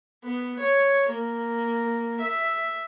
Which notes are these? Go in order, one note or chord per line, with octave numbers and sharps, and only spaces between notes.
B3
C#5
A#3
E5